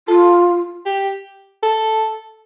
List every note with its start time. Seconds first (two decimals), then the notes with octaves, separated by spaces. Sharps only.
0.08 F4 A4
0.86 G4
1.63 A4